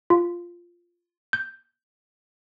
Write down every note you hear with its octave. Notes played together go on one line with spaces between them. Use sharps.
F4
G6